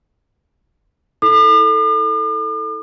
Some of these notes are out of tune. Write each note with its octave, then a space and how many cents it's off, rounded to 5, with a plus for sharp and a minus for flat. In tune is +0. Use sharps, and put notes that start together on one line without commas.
E4 -35 A4 +0 D6 +45